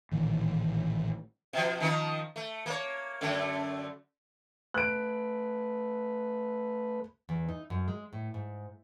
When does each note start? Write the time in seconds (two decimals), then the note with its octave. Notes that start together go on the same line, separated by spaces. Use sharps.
0.12 A1 A#2 D#3 E3
1.53 B2 F3
1.80 D#3 F3 D#4
2.36 A3
2.66 A#3 C#5
3.21 F#2 D3 A3
4.74 A3 B4 F#6 D7
7.29 E2
7.49 D#4
7.70 F#2
7.88 G#3
8.13 A2
8.34 G#2